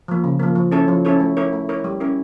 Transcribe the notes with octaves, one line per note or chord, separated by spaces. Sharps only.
F3 A#3
C#3
F3 A#3
F3
C#4 E4 A4 C#5
F3
C#4 E4 A4 C#5
A3
E4 A#4 C#5
A3
E4 A#4 C#5
G3
C#4 E4 A#4